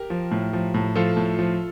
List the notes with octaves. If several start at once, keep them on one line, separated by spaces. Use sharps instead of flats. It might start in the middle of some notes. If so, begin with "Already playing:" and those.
Already playing: G4 A#4
F3
A2
F3
A2
F3 F4 A4
A2
F3